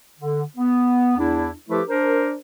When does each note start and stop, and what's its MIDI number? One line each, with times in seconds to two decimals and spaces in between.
0.20 0.42 50
0.57 1.13 59
1.18 1.52 40
1.18 1.52 62
1.18 1.52 64
1.70 1.82 53
1.70 1.82 57
1.70 1.82 64
1.70 1.82 67
1.70 1.82 69
1.70 1.82 71
1.88 2.35 62
1.88 2.35 70
1.88 2.35 72